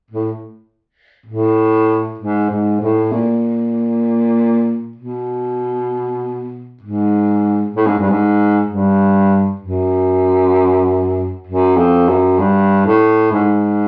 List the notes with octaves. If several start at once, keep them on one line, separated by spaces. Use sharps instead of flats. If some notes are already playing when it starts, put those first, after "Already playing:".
A2
A2
G#2
G#2
A2
A#2
B2
G#2
A2
G#2
G2
G#2
G2
F#2
F#2
F2
F#2
G2
A2
G#2